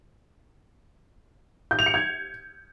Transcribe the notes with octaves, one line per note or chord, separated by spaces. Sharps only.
G6
F7
C#7
G#6